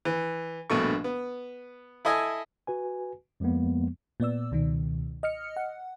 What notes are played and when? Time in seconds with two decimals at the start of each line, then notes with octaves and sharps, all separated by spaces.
0.05 E3
0.70 A#1 G2 B2 A3 C#6
1.04 B3
2.05 E4 A4 D#5 G#5
2.67 F#4 B4 G#5
3.40 F2 F3 G#3 A#3 B3
4.20 A#2 B3 D5 E6
4.52 C#2 B2 D#3
5.23 D#5 F6 C#7
5.57 F#5